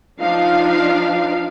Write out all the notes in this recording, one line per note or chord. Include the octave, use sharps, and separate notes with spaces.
F3 D4 D#4 F5